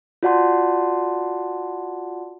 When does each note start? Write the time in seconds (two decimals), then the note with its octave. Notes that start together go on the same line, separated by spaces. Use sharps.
0.23 F4 F#4 D5 F#5 A5 C6